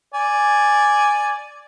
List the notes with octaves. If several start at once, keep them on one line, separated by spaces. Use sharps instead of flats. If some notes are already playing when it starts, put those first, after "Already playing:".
D5 G#5